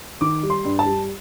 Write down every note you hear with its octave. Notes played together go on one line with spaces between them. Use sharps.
D#3 D6
G3
C6
G2
A5
G3